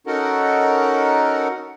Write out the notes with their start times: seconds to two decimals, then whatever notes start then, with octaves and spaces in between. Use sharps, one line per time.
0.07 C#4 D#4 F#4 A4 A#4 F#5